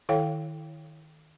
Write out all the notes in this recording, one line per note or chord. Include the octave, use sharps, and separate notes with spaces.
D#3 E4 A4 C#5 F5 G5